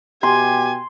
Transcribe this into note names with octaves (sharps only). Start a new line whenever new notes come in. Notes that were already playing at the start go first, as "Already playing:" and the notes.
B2 G4 G#5 C6